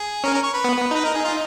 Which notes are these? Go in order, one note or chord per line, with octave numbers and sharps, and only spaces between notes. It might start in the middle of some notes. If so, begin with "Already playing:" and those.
Already playing: G#4
C#4 A#4
A#4
C#5
B4
B3
B3
D#4 B4
A#4
G#4
F4